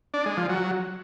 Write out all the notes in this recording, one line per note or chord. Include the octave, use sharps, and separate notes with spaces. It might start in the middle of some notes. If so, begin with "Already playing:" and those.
D4
G#3
F3
F#3